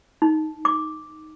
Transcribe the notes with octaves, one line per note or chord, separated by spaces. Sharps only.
D#4
D6